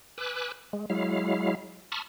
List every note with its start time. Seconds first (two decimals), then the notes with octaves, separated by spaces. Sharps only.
0.18 B4 G#5 D6 E6 F#6
0.73 G#3
0.90 F#3 G#3 E4 F5
1.92 A5 B5 C#6 D#6 F6